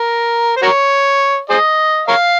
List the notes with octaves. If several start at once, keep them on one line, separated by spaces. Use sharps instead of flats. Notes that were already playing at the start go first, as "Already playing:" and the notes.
Already playing: A#4
C5
F#4 A#4 C#5
G#4 C5 D#5
A#4 C#5 F5